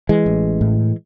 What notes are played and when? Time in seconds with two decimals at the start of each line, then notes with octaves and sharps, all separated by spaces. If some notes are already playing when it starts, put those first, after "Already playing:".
0.09 E3 G#3
0.26 A1
0.61 A2